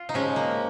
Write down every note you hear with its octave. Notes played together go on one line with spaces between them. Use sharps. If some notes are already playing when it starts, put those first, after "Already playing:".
Already playing: F4
D#4
F3 G#3 C#4
A#3